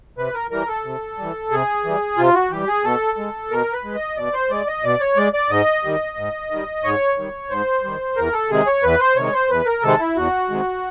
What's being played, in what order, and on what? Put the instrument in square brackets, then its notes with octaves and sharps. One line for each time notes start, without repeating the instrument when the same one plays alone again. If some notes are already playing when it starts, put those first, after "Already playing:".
[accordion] C3 B4
A#4
E3 G3 A#4
A4
C3
E3 G3
C3 G#4
E3 G3
C3 F4
F#4
E3 G3 G4
G#4
B2 A4
G#3
B2 A#4
B4
G#3
D#5
B2 D5
C5
G#3 D5
D#5
B2 D5
C#5
G#3 D5
D5
G#2 D#5
D#3 G3
G#2
D#3 G3
G#2 C#5
D#3 G3
G#2 C5
D#3 G3
E2 A#4
A4
C3 D#3 G#3 G#4
C#5
E2 B4
C5
C3 D#3 G#3 C#5
C5
E2 B4
A#4
C3 D#3 G#3 A4
E4
E2 F#4
C3 D#3 G#3